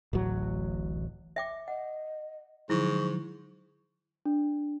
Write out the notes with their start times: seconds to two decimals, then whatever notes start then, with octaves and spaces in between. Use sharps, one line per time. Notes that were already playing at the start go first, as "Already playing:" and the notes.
0.13 D1 A1 F#3
1.36 E5 G5 D6
1.68 D#5 F#5
2.70 G#2 D3 F3 F#3 E4 C#6
4.25 D4